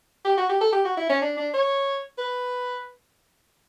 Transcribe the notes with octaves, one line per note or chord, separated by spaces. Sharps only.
G4
F#4
G4
A4
G4
F#4
E4
C#4
D4
D4
C#5
B4